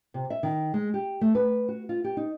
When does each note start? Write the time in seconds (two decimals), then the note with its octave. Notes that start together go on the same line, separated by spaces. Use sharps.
0.14 C3
0.30 E5
0.43 D#3
0.74 G#3
0.94 G4
1.21 A3
1.35 B4
1.68 F#4
1.89 F4
2.04 G4
2.17 D#4